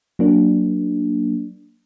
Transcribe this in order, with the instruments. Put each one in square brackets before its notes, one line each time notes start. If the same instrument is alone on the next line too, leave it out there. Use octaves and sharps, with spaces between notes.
[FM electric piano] F#3 A#3 D4